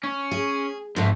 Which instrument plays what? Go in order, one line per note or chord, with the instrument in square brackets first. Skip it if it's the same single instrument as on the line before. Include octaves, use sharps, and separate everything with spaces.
[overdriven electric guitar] C#4
[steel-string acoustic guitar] G#4
[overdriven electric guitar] F2 A3 [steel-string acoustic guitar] G#2 A4